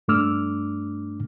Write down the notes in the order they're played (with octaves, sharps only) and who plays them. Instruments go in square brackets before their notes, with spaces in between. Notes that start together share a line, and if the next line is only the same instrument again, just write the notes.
[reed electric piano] G2 A3 D4 D6 E6 F6